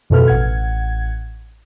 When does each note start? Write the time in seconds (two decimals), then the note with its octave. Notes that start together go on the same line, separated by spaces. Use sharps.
0.10 F2 B2 A4 B4 F6
0.28 A1 F#5 G#6